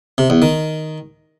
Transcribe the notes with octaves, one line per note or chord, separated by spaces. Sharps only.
C3
E2
D#3